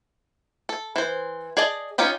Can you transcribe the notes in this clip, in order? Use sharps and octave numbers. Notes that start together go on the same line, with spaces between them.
A4
E3 C5
G#4 D5 D#5 A5
C#4 D#4 F4 G4 D#5